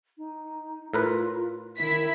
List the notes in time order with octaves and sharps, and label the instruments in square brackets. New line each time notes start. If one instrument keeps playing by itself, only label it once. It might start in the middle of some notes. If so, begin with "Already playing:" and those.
[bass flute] D#4
[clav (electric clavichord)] A2 A#4 B4 [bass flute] F4
[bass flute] D#3 [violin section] E4 B6